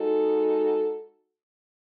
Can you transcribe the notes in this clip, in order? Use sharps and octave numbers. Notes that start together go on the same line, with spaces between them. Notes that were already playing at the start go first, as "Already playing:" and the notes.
Already playing: G#3 D#4 F#4 A4